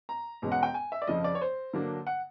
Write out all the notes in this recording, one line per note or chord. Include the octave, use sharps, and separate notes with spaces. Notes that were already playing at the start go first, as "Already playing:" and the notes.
A#5
E2 B2 G#3 C#4
F#5
G5
G#5
E5
D5
F2 C#3 F3 D#5
D5
C#5
C5
D3 F#3 A#3 D4
F#5